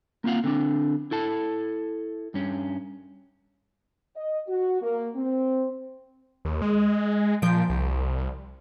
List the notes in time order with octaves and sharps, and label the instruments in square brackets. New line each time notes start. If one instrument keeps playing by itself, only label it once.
[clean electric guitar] A#3 C4 F4 F5 F#5
D3 C4 D4
E4 A4 A5
G2 C#4
[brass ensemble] D#5
F#4
A#3
C4
[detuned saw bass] D#2
G#3
[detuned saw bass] A#2 [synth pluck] F3 G6 D7
[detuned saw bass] C2